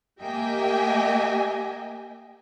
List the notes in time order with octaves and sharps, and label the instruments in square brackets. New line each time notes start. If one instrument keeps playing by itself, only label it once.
[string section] A#3 G4 D#5 E5 G5 G#5